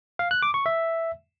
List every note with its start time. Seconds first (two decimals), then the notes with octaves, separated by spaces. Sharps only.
0.19 F5
0.31 F#6
0.42 D6
0.54 C#6
0.66 E5